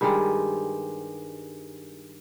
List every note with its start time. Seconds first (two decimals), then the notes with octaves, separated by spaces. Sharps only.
0.01 G2 D#3 G3 G#3